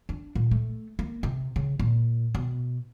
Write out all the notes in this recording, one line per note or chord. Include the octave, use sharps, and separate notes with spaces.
D4
A#2
A3
A#3
C3
C#3
A#2
B2